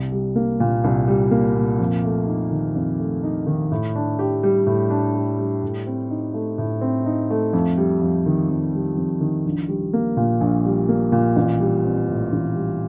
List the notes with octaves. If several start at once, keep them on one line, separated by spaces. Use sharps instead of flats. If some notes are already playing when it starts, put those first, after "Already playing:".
Already playing: C2
G3
A#3
A#2
C2
G3
A#3
A#2
F2
A3
D#4
D#3
F2
A3
D#4
D#3
A2
D4
G4
G3
A2
D4
G4
G3
A2
C4
D#4
A3
A2
C4
D#4
A3
F2
G3
F2
D#3
F2
G3
F2
D#3
A#1
G3
A#3
A#2
A#1
G3
A#3
A#2
A1
G3
C4
A2
A1
G3